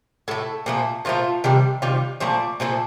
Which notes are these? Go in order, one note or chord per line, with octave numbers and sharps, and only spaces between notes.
A2 A3 A4
A#2 F3 A3
A#2 F3 A3 F4
C3 D#3 G3
C3 D#3 G3 F4
A#2 F3 A3 D5
A#2 F3 A3